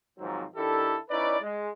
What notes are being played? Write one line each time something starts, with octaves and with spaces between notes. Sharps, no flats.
G#2 D#3 F3 F#3 C4
D#3 D4 E4 G4 A4
C#4 D#4 E4 B4 D5
G#3